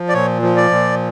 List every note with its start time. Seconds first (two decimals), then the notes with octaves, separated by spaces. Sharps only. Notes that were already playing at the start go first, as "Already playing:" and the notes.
Already playing: F3
0.09 D5
0.14 A#2 C#5
0.42 F3
0.57 D5
0.71 A#2